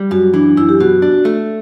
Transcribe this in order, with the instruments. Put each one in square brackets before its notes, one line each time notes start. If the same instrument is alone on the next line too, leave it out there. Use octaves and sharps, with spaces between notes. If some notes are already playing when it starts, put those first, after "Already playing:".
Already playing: [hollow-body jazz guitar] G3
[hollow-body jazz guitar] F#2 [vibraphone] F#4
[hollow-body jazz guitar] E3 [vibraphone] D4
[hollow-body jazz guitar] F#2 [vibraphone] E4
[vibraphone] G4
[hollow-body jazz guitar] B2 [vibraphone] F#4
[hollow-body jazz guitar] D4
A3